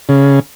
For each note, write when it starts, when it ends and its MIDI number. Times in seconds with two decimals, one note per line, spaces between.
0.09 0.40 49